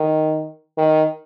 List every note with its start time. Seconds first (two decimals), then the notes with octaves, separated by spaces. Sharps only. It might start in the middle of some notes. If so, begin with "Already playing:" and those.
Already playing: D#3
0.78 D#3